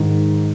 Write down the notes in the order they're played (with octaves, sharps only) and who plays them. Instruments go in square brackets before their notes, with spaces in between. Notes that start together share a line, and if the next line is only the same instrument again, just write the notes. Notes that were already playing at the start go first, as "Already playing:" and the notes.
Already playing: [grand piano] G#2 D#3